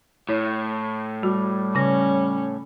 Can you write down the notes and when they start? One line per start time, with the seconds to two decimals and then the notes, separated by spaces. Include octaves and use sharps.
0.29 A2 E4 C#5
1.23 G3 F#4
1.75 C#3 C#4 A#6